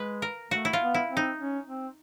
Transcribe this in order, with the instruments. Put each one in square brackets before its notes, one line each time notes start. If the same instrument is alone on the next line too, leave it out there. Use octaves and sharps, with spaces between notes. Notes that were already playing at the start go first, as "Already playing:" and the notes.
Already playing: [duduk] G#3 [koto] B4
[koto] A#4
[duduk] A3 [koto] F#4
[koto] E4
F4
[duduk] B3
[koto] E4
[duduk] C4
[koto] D#4
[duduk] C#4
C4